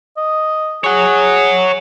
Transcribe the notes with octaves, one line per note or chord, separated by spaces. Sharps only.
D#5
G#4 C#5 F#5